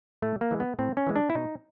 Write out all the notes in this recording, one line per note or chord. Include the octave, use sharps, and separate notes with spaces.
A2 A3
A#3
E3 G#3
B3
A2 C4
C#4
E3 G#3
D4
E4
B2 D#4